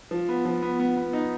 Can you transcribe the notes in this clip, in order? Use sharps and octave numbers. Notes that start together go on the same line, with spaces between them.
F3
B3
F3
B3
B3
B3
D#4